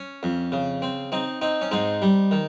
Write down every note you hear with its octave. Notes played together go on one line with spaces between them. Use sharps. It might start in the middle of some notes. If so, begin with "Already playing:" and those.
Already playing: C#4
F2
C#3
C4
C4 D#4
C4 D#4
C#4
G#2 C4 D#4
G3
D#3